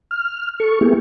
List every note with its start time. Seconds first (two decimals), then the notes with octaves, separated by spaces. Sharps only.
0.11 F6
0.60 A4 C#6
0.81 A#3 B3 E4 G4 G#4